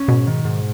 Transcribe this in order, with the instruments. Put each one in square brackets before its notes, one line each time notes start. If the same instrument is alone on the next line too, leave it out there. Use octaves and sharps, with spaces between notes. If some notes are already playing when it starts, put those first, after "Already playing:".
Already playing: [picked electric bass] C#4
[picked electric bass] G#2 [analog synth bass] B2
[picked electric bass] D#3
G#2